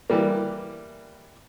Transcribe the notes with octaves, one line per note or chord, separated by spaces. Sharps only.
E3 G3 A#3